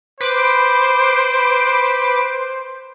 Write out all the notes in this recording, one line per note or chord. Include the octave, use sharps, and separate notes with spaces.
B4 C5 D6 D7